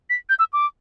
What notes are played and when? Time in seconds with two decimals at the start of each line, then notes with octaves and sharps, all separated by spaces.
0.10 B6
0.29 G6
0.39 E6
0.53 D6